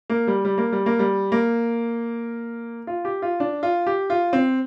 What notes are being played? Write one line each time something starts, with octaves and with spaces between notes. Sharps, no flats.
A#3
G3
G3
A#3
G3
A#3
G3
A#3
F4
G4
F4
D4
F4
G4
F4
C4